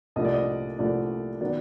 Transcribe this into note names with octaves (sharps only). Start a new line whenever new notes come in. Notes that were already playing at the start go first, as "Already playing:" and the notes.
C2 A#2 F3 A3 D4 D#5
D5
D#5
C2 A#2 F3 A3 D4 D5
D#3 F#3 B3 D5